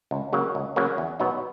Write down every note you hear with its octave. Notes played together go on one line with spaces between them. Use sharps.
C#2
C#3 F#3 A#3
C#2
C#3 F#3 A#3
E2
B2 F#3 B3 D#4